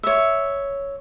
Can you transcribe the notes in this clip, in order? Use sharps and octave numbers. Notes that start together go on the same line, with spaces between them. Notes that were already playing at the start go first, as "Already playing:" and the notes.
C#5 E5